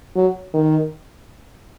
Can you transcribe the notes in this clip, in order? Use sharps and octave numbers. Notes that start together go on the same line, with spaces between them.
F#3
D#3